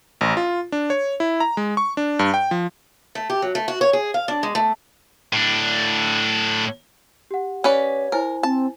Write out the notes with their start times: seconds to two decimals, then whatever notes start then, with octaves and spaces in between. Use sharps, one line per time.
0.21 A1
0.37 F4
0.72 D4
0.90 C#5
1.20 E4
1.40 A#5
1.57 G#3
1.77 C#6
1.97 D4
2.19 G2
2.34 G5
2.51 F3
3.15 A3
3.30 G4
3.42 F#3
3.55 A3
3.68 F#4
3.81 C#5
3.93 G#4
4.14 F5
4.28 D4
4.43 G#3
4.55 A3
5.33 A2 D4
7.31 G4 F#5
7.64 C#4 B4 C#5 D5
8.12 E4 A#4 C5 G#5
8.43 C4 A5